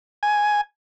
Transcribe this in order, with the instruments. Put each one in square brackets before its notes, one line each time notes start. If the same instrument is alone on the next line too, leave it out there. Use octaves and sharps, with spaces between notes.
[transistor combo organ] G#5